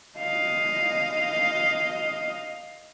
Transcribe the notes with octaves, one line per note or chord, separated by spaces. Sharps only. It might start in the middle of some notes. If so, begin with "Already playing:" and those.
D#5 F5